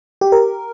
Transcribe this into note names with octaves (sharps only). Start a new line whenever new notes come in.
G4
A#4